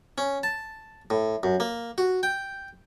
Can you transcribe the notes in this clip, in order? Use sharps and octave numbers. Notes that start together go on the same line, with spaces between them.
C#4
A5
A2
F#2
A#3
F#4
G5